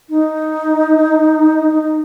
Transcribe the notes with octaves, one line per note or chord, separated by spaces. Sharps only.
D#4
D#4